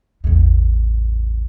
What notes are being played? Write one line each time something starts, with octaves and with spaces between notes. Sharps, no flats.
A1 E2